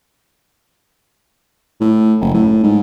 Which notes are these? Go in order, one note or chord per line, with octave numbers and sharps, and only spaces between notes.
A2
F#1
A2
G#2